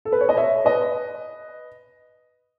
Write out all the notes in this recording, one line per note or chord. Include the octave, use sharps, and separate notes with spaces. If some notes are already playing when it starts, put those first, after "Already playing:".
A4
B4
C#5
D#5
C#5 E5
B4 D#5